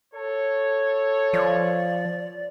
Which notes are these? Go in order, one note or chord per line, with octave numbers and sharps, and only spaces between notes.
A4 C#5
F3 D5